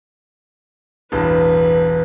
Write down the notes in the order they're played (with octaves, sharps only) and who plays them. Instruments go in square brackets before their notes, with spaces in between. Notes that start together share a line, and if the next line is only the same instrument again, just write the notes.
[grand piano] E1 A1 G2 [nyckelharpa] B4